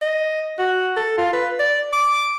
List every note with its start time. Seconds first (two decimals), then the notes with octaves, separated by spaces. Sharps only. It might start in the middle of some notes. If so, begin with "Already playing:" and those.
0.02 D#5
0.59 F#4
0.97 A4
1.18 F4
1.33 B4
1.59 D5
1.93 D6